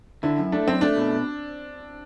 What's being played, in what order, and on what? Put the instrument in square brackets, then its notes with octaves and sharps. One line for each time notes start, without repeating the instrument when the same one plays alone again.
[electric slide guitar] D3 [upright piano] E4
[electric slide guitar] F#2
[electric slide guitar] A3 [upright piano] D4
[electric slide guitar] F#2 [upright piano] C4
[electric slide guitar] A3 [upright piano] D4
[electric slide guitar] B2